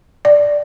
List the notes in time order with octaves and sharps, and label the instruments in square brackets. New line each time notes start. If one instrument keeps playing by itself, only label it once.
[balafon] D5